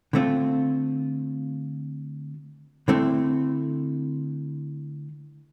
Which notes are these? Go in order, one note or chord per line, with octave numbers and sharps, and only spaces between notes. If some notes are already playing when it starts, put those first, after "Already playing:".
D3 A3 C4 F4
D3 A3 C4 E4